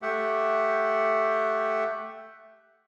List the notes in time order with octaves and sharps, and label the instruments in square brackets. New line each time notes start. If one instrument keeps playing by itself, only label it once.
[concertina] A3 G4 E5 F#5